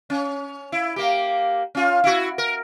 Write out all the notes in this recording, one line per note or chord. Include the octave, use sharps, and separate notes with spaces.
C#4
E4
A#3 G4
C#4 F4
E4 F#4
A#4